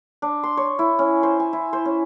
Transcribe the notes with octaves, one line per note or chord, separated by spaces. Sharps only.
D4
C6
C#5
E4
C#4
C5
G#5
E4
C5
C#4